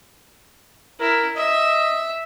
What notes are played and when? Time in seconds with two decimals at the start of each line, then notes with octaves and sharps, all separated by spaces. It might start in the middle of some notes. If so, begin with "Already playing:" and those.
1.00 E4 A#4
1.37 D#5 E5